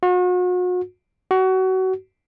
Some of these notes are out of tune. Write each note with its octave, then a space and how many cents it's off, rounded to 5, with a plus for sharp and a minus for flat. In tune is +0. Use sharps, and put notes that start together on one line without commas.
F#4 -40
F#4 +25